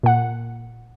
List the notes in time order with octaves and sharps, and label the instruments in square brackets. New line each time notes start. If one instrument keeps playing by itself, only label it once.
[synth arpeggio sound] A#2 F#5